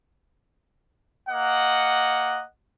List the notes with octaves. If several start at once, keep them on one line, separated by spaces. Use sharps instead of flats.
A#3 D#5 F#5